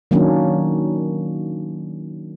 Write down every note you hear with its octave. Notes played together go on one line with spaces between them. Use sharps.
D#3 F#3 A#3 C#4 D4